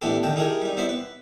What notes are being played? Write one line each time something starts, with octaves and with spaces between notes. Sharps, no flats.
A1 B3 D4 E4 G4 A4
D3 D#3 G5 A5
D#4 E4 G4 G#4 A#4
G3 D#4
B3 E4 C5 D5 E5
B4